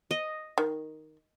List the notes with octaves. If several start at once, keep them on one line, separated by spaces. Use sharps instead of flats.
D#5
D#3